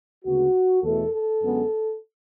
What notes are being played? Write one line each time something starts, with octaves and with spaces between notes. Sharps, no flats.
D2 C#3 G#3 B3 F#4
E2 B2 A3 A4
A4
F#2 D3 G#3 B3